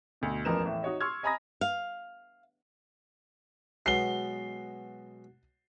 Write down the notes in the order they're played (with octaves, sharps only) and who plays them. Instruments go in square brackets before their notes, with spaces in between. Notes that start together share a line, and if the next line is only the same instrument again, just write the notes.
[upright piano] D2 B2
E1 A1 F3 A#4 B4 E7
A2 E3
D#4 F#4 C#5 D#5
C6 C#6 E6 F6 G#6
D#5 G#5 A#5 B5 D#6 A#6
[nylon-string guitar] F5
[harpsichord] B2 F#3 G#3 [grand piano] C7 G7